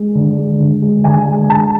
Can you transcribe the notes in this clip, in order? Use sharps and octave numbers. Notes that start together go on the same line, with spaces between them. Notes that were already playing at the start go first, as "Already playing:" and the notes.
Already playing: G#3
D3
G#3
D3
G#3
D3 G#5
G#3
D3 A5